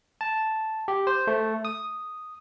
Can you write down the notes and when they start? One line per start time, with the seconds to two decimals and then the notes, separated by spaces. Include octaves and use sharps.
0.21 A5
0.88 G4
1.07 C5
1.27 A3
1.65 D#6